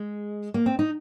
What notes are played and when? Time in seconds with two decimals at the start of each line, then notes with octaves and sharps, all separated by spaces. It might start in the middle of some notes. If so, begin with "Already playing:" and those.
Already playing: G#3
0.54 A#3
0.66 C4
0.79 D#4